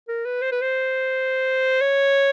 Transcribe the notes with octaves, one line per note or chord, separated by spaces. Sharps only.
A#4
B4
C5
B4
C5
C#5